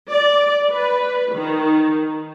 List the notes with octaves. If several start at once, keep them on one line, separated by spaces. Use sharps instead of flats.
D5
B4
D#3